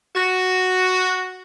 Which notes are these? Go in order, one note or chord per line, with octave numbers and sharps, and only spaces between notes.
F#4